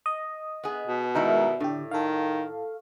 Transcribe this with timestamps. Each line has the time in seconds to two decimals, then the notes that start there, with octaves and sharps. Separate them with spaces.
0.06 D#5
0.64 B3 G#4
0.87 B2
1.15 D#3 G3 G#3 D#4 E4 A#4
1.60 A2 D3 G4
1.91 D#3 A4 F5